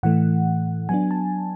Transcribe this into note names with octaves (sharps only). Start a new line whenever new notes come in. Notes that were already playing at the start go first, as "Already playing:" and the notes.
A2 E3 A3 F#5
F#3 B3 D4 G#5
A5